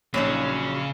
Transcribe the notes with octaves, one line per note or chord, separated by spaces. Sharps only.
A#1 C#3 F#3 C#4 D#4